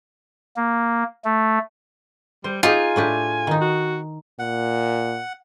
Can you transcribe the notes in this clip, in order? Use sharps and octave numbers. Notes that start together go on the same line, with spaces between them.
A#3
A3
G3 C5
D#4 F4 G4 G#4 G#5
A2 D4 G4
D#3 D#4
F#4
A#2 F#5